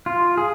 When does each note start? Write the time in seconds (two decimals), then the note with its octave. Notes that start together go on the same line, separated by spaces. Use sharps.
0.06 F4
0.37 G#4